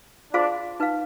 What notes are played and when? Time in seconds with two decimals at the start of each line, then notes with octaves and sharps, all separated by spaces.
0.34 D4 F4 G#4 C5 F5 C6
0.80 D#4 B4 F5